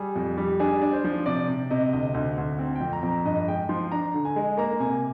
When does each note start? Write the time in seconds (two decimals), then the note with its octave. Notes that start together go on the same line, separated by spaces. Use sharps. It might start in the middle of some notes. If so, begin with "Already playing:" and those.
Already playing: G3 G#4
0.16 F2
0.38 G3
0.59 D4 G#4
0.82 D4
0.93 C5
1.04 F3
1.26 C3 D5
1.48 C3
1.70 C3 D#5
1.93 D2 D#5
2.14 D2
2.38 D2
2.59 C4
2.75 G5
2.81 F2
2.93 A#5
3.03 F2
3.09 A#5
3.25 G2 D#5
3.48 G#3 G5
3.69 F3 C6
3.92 D4 A#5
4.14 D3
4.25 G#5
4.36 G#3
4.58 A#3 A#5
4.80 C3 G#5